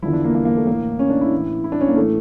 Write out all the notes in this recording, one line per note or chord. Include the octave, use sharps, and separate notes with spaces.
E2 D3 F3 E4
D4
A#3
A#3
A#3
A3
A2 E3 A#3
C#4
D4
E4
A2 E3
E4
D4
C#4
A#3
A2 E3 A3